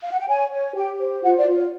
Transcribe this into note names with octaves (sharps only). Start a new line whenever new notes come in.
F5
F#5
G5
C#5 G#5
C#5
G4 G5
C5
F4 F#5
D5
F4
C#5